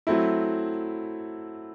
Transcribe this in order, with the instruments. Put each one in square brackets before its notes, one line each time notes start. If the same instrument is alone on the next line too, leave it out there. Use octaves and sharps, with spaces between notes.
[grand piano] F#3 A3 C4 E4